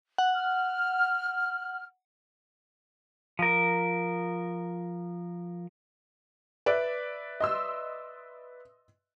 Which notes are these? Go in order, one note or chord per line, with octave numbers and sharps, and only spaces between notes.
F#5
F6
F3 A#4
B4 D5 E5
D#5 C6 E6